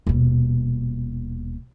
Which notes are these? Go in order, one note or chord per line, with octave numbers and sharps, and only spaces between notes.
D#1 B2